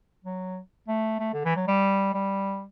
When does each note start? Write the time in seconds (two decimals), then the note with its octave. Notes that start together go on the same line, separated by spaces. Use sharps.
0.25 F#3
0.88 A3
1.19 A3
1.34 D3
1.45 E3
1.56 F#3
1.68 G3
2.14 G3